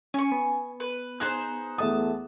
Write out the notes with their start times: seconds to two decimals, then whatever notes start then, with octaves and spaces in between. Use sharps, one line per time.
0.14 C#4 G#5 C#6
0.32 B3
0.80 B4
1.20 D#4 G#4 C5 F#6
1.78 E2 A3 A5 D#6